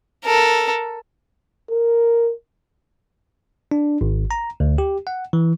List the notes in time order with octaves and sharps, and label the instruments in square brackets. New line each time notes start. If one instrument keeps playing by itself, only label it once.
[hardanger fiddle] A4 A#4
[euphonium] A#4
[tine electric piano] D4
G#1
A#5
D2
G4
F#5
E3